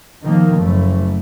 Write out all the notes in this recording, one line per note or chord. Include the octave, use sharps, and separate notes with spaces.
D#3 F3 A#3
F#1 A3